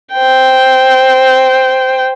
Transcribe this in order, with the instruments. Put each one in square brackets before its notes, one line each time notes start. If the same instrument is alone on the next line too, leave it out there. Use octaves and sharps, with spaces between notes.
[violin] C5 G5